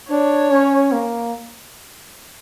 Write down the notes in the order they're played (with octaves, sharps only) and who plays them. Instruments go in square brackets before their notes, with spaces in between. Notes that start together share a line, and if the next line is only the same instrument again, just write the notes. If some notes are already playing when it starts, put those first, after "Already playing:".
[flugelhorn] D4 [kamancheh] C#5
[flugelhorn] C#4
A#3